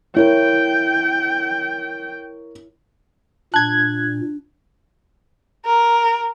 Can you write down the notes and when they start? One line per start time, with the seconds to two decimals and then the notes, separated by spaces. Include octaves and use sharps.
0.17 E4 A#4 C#5 G5
3.54 A#2 D4 A5 F#6 G#6
5.65 A#4